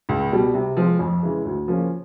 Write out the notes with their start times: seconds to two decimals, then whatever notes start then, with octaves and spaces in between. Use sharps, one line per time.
0.09 C#2
0.31 B2 G3
0.54 C3
0.77 F3 G#3 C4
0.99 F2
1.23 C#3 E3 G#3
1.45 D2
1.68 C#3 F3 A#3 C#4